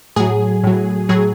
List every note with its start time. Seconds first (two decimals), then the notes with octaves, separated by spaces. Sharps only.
0.16 A2 F#3 G#4
0.64 A2 F#3
1.09 A2 F#3 G#4